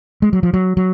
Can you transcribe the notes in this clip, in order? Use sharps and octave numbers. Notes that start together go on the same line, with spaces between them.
G#3
F#3
F3
F#3
F#3